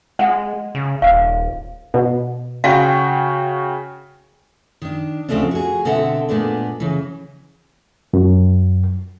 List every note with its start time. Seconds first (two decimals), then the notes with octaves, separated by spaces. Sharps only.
0.19 G#3 F#5
0.75 C#3
1.02 D#1 F5
1.94 B2
2.64 C#3 F#4 F5 G5
4.82 D#3 D4
5.28 D2 C#3 F3 A3 C4 D4
5.51 F#4 G#4
5.85 B2 D3 C4 A4 E5 F#5
6.29 A#2 G#3 A3 B3 D4
6.80 C#3 E3
8.13 F#2